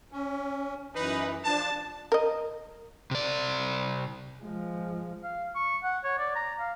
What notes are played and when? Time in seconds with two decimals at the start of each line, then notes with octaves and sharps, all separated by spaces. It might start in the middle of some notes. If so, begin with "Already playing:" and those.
0.12 C#4
0.95 F#2 E3 D#4 B4
1.44 F3 D4 A5
2.12 A#4 D#5
3.11 C3 D5
4.42 F3 G#3
5.24 F5
5.56 C#6
5.84 F#5
6.04 C#5
6.19 D5
6.36 A#5
6.60 F5